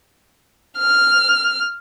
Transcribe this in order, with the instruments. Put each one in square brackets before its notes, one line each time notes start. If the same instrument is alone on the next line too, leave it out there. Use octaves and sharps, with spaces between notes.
[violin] F6